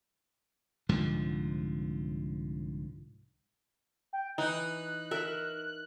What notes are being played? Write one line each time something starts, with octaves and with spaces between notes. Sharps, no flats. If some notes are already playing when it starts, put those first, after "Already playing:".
C2 G#2 D3 F3
G5
E3 D#4 F#6
A#4 E5